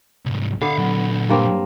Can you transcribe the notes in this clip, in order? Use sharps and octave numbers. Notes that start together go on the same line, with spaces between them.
C2 G#2
D3 B3 E5 F5
A#2 F#3
G2 A#3 C4